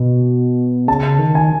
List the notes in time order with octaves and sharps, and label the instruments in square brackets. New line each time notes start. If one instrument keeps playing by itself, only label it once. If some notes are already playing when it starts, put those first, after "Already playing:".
Already playing: [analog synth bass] B2
[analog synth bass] C#3 [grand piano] A5
[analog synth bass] D#3
[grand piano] G#5